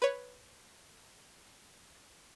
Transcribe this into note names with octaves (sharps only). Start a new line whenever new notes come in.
B4 C#5